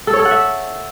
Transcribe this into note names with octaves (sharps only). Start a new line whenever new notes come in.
A4
C#5
A4
F#5
E5